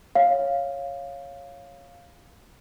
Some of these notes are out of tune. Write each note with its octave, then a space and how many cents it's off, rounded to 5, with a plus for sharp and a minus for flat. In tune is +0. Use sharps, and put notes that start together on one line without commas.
C#5 -5 F5 +0